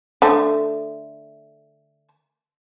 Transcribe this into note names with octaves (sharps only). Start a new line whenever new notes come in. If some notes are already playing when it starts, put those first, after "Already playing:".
D3 A3